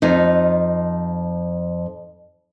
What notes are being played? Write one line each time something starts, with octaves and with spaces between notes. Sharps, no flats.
F2 D#4